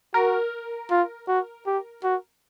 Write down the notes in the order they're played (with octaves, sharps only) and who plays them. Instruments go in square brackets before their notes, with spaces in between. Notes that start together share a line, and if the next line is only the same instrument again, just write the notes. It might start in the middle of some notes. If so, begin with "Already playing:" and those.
[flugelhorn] F#4 [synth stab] A#4
[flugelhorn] F4
F#4
G4
F#4